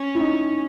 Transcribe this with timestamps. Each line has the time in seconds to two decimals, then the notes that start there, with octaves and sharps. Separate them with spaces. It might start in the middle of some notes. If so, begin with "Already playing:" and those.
Already playing: C#4
0.15 E4
0.20 D#4